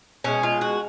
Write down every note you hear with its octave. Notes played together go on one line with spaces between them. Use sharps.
B2 G#3 C#4
F4
F#4